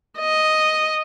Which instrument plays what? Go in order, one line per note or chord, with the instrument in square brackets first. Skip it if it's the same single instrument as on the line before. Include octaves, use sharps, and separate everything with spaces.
[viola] D#5